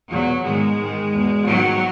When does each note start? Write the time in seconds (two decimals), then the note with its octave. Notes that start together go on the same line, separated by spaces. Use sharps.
0.10 E2 B2 F#3
0.44 G#2 D#3 G#3
0.78 G#2 D#3
1.11 E2 B2
1.45 G#2 D#3 F#3